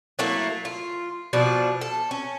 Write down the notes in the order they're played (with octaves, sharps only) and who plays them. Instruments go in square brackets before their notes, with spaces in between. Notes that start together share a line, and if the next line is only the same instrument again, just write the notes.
[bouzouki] F#3 A3 A#3 E4
F4
B2 F3 D4
A4
C#4